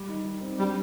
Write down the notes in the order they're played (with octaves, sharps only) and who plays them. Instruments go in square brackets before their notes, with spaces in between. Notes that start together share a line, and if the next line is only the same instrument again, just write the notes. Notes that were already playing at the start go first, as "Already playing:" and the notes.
Already playing: [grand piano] G3
D#3
D#3
C4
[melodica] G3 [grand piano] D4